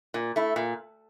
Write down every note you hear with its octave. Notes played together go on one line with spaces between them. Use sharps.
A#2
A3 E4
A#2